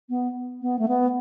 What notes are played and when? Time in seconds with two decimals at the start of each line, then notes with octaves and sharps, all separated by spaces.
0.09 B3
0.62 B3
0.79 A3
0.88 B3